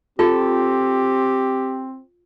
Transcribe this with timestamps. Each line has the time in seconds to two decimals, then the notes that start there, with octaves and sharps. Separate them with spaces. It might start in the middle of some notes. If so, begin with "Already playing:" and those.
0.19 C4 F4 G4 A4